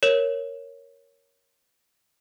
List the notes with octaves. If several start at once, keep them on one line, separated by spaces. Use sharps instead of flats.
A#4 C#5 E7